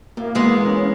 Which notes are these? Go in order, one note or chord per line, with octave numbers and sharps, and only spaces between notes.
A2 A#3
E3 G#3 B3
C#4